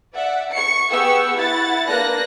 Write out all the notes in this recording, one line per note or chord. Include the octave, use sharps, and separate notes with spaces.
D5 E5 F#5
C#6 C#7
B3 G4 G#4 F#5 C#6 E6
E4 F#5 A6
A#3 D4 B4 F#6 A#6